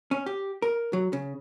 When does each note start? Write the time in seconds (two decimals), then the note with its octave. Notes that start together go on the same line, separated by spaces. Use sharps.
0.11 C#4
0.26 G4
0.62 A#4
0.93 F#3
1.13 C#3